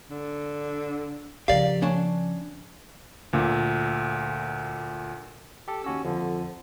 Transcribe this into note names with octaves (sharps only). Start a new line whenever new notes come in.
D3
C#3 F3 G4 A#4 D5 F5
C#4 D4 A5
D2 A#2
G4 A4
D#2 C#4 F#4 E6
F2 D3 F3